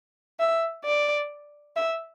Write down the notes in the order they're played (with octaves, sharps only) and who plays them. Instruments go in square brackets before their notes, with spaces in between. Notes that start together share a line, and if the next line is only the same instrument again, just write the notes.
[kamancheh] E5
D5
E5